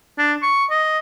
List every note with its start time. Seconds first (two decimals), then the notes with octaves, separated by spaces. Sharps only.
0.18 D4
0.43 C#6
0.70 D#5